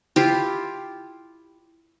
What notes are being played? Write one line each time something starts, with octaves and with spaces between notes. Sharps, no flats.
E4 F4 G4